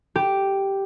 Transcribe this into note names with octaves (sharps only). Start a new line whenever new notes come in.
G4